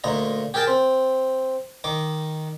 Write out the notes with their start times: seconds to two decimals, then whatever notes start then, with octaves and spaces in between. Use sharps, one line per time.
0.04 D2 A#2 D#5 A#5
0.54 G4 G#4 A#4 G5 A5
0.67 C4
1.84 D#3 D#5 D6